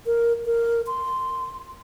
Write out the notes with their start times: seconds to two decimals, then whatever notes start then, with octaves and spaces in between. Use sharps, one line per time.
0.06 A#4
0.46 A#4
0.87 C6